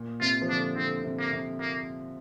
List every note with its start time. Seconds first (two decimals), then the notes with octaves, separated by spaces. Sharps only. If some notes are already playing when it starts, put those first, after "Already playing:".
Already playing: A#2
0.21 C3 F4
0.42 F3
0.49 D3 D4
0.76 D3 C4
1.04 C3
1.19 A#3
1.32 C3
1.61 A#3